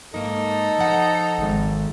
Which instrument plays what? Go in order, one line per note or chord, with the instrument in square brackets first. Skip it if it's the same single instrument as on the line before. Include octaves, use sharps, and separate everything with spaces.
[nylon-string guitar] G#2 A#3 [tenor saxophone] D#4 [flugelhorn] A4
[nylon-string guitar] F3 F#5
[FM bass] G#1